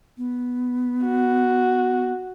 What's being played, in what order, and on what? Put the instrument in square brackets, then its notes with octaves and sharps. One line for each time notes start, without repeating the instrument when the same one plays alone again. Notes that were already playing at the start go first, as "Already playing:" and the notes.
[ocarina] B3
[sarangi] F#4